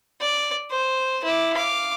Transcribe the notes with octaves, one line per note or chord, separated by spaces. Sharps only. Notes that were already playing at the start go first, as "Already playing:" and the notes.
D5
C5
E4 D6
F5 D6